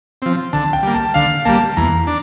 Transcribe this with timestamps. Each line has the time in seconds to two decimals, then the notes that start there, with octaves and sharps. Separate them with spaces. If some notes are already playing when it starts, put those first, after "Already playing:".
0.22 F3 C4
0.53 D3 A5
0.73 G5
0.83 G3 A#3
0.94 A5
1.14 D3 F5
1.45 G3 A#3 A5
1.77 E2 A#5
2.07 D4